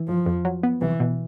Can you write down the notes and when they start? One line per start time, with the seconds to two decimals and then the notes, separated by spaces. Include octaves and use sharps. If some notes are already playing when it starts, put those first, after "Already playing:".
Already playing: E3
0.08 G1 F3
0.26 F2
0.45 F#3
0.63 B3
0.81 C2 E3
1.00 B2